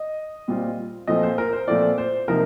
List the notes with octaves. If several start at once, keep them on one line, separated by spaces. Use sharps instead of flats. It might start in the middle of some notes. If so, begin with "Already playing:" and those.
Already playing: D#5
A#2 G3 C4 F4
A#2 F3 A3 C4 F4 D#5
C5
A#4
C5
A#2 F3 A3 C4 F4 D5
C5
C3 F3 A#3 D#4 A#4